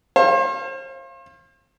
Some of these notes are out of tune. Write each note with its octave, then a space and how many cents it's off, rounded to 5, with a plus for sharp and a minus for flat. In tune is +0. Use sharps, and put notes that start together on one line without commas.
C5 +40 F5 -20